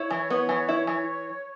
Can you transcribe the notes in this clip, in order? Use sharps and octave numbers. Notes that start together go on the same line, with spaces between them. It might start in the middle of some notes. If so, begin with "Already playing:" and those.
Already playing: E4 C#5
E3
B3
E3
E4
E3